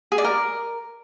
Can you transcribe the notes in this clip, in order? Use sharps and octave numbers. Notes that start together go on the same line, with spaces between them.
G#4
D5
A#4